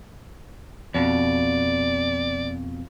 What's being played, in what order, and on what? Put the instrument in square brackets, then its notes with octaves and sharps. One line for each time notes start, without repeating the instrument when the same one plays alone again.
[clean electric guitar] F2 B2 [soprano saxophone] D5